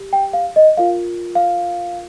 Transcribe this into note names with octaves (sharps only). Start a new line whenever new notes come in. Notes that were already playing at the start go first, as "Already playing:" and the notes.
Already playing: G4
G5
F5
D#5
F4 A#4 F5
F5